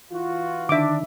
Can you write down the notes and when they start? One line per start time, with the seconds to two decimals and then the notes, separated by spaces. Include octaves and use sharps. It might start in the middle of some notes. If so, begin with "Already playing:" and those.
0.12 E3 F4 F#4
0.69 D3 D#3 D4 E5 D6